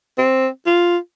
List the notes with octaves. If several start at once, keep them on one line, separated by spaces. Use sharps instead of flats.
C4
F4